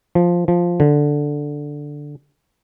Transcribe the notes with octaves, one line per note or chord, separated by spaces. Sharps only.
F3
F3
D3